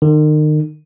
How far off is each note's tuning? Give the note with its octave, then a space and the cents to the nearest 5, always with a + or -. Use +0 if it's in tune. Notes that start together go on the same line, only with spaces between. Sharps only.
D#3 -35